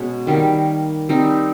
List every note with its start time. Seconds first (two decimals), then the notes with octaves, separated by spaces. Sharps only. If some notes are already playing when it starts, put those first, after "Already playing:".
Already playing: B2 G#3 C#4
0.27 D#3 G3 A#3
1.09 G3 C4 D#4